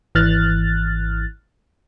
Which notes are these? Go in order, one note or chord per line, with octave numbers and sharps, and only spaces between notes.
G#1 E3 F6 F#6 A6